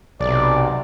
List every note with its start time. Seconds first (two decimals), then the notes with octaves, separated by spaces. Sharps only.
0.20 B1 C3 D5